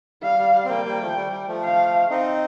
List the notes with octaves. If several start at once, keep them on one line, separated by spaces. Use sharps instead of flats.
G3 F5
G3
G3
C4
G3 A#3 G5
G3 A#3
F3 A3
G3
G3
F3 A3
F5
C4 D#4 D#5